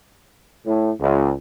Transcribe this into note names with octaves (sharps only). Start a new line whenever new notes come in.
A2
C#2